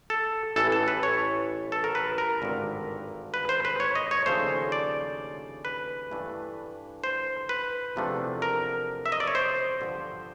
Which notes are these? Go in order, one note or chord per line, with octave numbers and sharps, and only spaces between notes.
A4
A1 A2 E3 A4
A4
B4
C#5
A4
A#4
B4
A#4
G#1 G2 D3
B4
C5
B4
C#5
D#5
C#5
D#2 C#3 F3 A3 D4 C5
D5
B4
G2 E3 A3 D4
C5
B4
E2 C3 F3 A3 D4
A#4
E5
D#5
D5
C#5
C5
G2 D3 F3